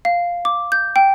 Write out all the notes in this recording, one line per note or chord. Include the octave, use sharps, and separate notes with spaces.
F5
D6
G6
G5